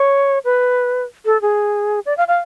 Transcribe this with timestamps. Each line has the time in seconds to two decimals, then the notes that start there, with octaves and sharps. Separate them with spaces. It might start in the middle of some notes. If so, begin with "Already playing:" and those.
Already playing: C#5
0.45 B4
1.26 A4
1.42 G#4
2.06 D5
2.17 F5
2.28 F5